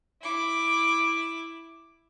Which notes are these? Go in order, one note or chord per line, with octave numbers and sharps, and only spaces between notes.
E4 D6